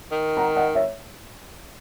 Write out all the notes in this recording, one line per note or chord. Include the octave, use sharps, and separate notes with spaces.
D#3
F#5 A#5
D#5 F#5
C#5 E5